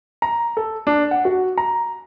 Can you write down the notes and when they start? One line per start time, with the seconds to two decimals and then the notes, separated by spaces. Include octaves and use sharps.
0.22 A#5
0.57 A4
0.87 D4
1.11 F#5
1.25 F#4
1.58 A#5